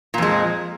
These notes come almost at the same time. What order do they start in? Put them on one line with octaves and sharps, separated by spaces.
A#2 F2 G#3